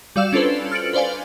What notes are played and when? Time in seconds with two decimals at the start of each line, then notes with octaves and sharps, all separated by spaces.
0.16 G3 F#4 D5 F5 E6 E7
0.33 C#4 D4 F4 A4 B4 C5
0.72 F6 A6 C#7 D7 F#7
0.93 B4 C5 D5 F5 G#5